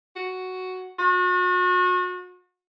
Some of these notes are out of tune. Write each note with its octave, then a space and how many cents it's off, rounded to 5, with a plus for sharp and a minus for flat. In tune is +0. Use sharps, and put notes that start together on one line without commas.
F#4 +5
F#4 -35